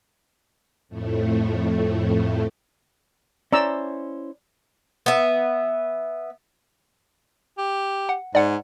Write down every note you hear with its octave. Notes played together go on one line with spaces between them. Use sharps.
F2 A2 A3
C#4 E4 C5 D5 A#5 E6
B3 E5
G4
F#5
G#2 D5 F#5